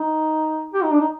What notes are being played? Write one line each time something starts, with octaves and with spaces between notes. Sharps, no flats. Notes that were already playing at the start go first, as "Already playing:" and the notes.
Already playing: D#4
G4
D#4
D4
D#4